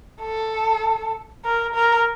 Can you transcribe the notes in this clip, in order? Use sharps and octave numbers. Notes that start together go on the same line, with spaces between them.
A4
A#4
A#4